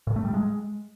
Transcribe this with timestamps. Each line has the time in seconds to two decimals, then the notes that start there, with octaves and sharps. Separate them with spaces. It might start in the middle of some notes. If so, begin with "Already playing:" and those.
0.07 A2
0.16 A3
0.25 G3
0.34 G#3